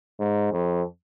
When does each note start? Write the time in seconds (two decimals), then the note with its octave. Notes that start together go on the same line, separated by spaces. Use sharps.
0.20 G#2
0.53 F2